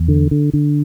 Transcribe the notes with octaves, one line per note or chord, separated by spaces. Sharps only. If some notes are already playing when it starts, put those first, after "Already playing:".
Already playing: E2
D3
D3
D3